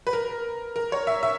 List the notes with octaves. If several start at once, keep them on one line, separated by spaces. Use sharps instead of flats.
B4
A#4
A#4
C#5
E5
E5